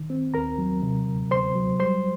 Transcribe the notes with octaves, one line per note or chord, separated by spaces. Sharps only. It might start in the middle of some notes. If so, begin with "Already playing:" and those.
Already playing: D#3
C4
D#2 A#4 A#5
F#3
C3
D2
D2 C5 C6
F#3
G3 C5 C6